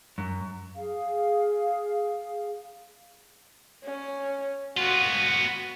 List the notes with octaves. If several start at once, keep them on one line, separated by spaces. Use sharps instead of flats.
F#2
G#4 F5
C#4
B3 F4 F#4